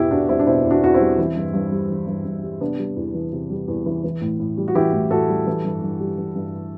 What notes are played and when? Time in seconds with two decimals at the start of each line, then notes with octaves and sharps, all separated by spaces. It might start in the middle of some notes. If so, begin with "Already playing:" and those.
Already playing: E2 B2 E4 G4
0.11 E2 D4 F#4
0.29 G3 C4 E4
0.39 D4
0.47 B2 C4 E4
0.65 E2
0.71 D4 F#4
0.83 E2 F#4
0.94 C4 E4
1.00 G3
1.18 E3
1.36 G2
1.54 G2
1.72 G3
1.90 E3
2.07 G2
2.25 G2
2.43 G3
2.61 C3 B3 D4
2.79 G3
2.96 E2
3.14 E3
3.33 C3
3.50 G3
3.68 E2
3.86 E3
4.04 E3
4.21 A2
4.39 A2
4.57 G3
4.68 F#4
4.75 E3 E4 G4
4.93 A2
5.11 A2 F#4 A4
5.29 G3
5.47 E3
5.65 G2
5.82 G2
6.00 G3
6.18 E3
6.36 G2